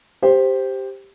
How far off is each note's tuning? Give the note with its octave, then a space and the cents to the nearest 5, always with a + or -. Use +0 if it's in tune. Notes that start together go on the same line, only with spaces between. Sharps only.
G4 +0 C5 +0